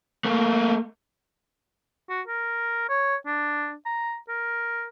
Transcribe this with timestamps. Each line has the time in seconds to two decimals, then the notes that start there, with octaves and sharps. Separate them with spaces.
0.25 A3 A#3
2.10 F#4
2.28 A#4
2.89 C#5
3.26 D4
3.86 A#5
4.29 A#4